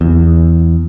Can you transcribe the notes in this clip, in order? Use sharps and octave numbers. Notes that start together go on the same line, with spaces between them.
E2